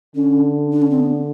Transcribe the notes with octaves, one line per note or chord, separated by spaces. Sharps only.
D3 C#4
D4
C#4
C4
B3